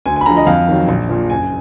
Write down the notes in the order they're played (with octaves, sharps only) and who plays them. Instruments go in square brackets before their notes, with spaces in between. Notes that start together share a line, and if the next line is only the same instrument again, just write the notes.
[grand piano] D2 G#5
G#5
B5
D3 F3 A#5
D#5
F2 F5
D#3 F#3
A#1
A#2 F3
F#1 G#5